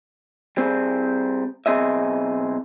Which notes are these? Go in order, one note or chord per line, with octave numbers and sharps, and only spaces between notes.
G3 C4 G#4
B1 C4 G#4 D#5 E5